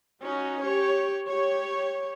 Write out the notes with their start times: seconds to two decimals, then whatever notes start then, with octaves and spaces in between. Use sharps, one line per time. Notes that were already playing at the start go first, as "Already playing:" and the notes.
0.23 C#4 D#4 F#4
0.61 G4 C#5
1.27 G4 C#5